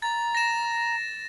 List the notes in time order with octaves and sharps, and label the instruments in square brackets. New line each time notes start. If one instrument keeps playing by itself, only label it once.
[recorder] A#5 [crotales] A6
[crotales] A#6 E7